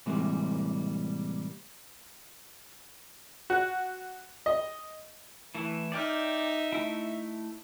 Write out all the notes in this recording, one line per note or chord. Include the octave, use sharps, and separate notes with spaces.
A2 C3 E3 G3 G#3 A#3
F#4
D#5
E3 A3 E4
D#4 D5 E5 G5 F6
A3 E4